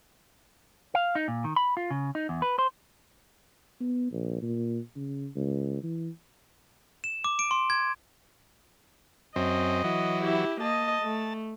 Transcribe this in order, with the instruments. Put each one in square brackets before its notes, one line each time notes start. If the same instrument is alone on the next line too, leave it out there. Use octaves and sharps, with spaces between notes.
[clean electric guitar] F5
D#4
A#2
D#3
B5
F4
C#3
D#4
E2
B4
C5
[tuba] B3
A#1
A#2
C#3
C#2
E3
[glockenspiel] E7
D6
D7
C6
G#6
[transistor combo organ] F#2 C4 [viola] D#5
[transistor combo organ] E3 F#3
[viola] E4 G4
[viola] A#3 D#5 [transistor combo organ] A5
[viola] A3